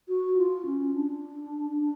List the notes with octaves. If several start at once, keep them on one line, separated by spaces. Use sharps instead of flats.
F#4
F4
C#4
D4
D4